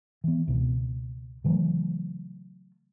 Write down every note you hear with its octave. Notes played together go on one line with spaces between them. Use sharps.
E3 B3
C#2 B2
C#3 E3 F#3 A3